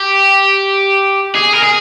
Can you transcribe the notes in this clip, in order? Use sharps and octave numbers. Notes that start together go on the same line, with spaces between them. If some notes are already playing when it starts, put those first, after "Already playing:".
Already playing: G4
G#4
A#4
G#4